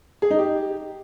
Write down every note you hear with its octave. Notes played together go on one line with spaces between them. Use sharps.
G#4
D#4
G4